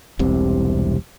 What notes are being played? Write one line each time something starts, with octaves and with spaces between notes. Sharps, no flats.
E1 C2 C3